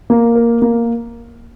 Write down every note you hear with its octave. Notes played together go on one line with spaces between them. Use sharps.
A#3
A#4
A#3